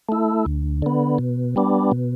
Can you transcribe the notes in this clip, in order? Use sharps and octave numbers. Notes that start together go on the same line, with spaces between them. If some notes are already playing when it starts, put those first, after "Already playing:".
A3 E4
D2
D3 B3
B2
G3 B3 D4
B2